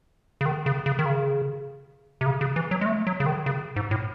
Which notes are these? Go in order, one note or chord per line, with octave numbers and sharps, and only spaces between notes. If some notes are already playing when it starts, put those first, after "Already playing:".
C#3
D#3
C#3
C#3
D#3
C#3
C3
C#3
C#3
E3
F#3
G#3
A3
F#3
C#3
D#3
C#3
G#2
A2